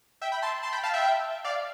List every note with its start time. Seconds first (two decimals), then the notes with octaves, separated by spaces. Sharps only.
0.21 E5 G5
0.32 G5 B5
0.42 A5 C6
0.63 A5 C6
0.72 G5 B5
0.83 F5 A5
0.93 E5 G5
1.44 D5 F5